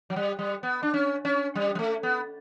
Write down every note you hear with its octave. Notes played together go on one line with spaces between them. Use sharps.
F#3
G3
G3
B3
D4
C#4
C#4
G3
G3
A3
B3